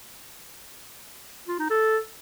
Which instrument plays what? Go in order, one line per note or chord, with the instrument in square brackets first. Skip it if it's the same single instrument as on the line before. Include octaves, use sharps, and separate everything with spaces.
[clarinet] F4
D#4
A4